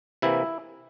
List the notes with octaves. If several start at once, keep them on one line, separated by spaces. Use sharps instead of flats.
C3 E3 A#3 E4